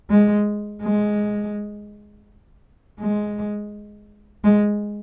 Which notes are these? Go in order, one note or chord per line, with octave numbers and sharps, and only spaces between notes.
G#3
G#3
G#3
G#3